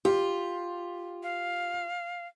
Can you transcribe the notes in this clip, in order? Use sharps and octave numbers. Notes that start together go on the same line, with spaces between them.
F4 G4
F5